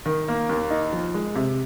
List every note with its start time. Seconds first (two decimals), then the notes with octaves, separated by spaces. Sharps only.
0.06 D#3
0.28 A#3
0.49 D#2
0.70 D#4
0.93 F3
1.14 G#3
1.35 C3